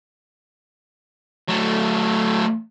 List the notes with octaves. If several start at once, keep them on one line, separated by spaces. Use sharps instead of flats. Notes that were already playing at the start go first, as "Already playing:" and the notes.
F#3 A3